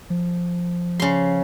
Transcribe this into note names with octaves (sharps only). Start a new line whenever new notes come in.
F3
C#3 C6